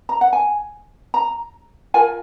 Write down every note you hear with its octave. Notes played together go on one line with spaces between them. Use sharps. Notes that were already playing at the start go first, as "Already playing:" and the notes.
A#5
F#5
G#5
A#5
F4 A#4 G#5